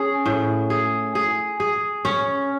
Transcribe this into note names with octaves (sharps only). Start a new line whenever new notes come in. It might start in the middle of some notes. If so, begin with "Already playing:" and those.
Already playing: C#4 G#4
A2
G#4
G#4
G#4
C#4